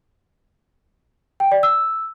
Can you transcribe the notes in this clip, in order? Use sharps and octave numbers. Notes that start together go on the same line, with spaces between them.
G5
D5
E6